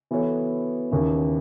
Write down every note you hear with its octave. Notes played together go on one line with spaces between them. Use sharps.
E3 B3 F#4 A4 C#5
D#2 C#3 E3